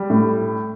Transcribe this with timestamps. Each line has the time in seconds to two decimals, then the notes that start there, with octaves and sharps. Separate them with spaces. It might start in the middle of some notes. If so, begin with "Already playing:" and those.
Already playing: G3
0.10 A2